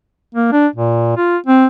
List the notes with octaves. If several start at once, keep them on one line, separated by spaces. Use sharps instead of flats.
A#3
D4
A#2
F4
C4